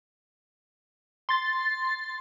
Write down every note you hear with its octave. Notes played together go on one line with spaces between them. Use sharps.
C6 A6